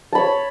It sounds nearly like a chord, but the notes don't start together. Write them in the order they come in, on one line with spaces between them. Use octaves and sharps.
A5 B5 C#5